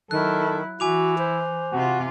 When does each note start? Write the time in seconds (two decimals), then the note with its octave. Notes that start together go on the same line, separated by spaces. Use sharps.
0.11 D#3 F#3 E4 A4 F#6
0.80 E3 E4 F#4 G#5 D6 F7
1.18 C5
1.73 C3 F4 F#4